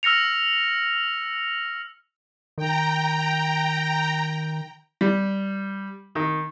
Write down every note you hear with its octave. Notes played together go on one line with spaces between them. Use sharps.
E6 F6 A#6 C#7 F7
D#3 G5 A#5
G3
D#3